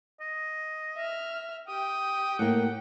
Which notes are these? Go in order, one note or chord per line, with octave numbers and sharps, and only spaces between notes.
D#5
E5 F6
G4 G5 D#6
A2 A#3 F#5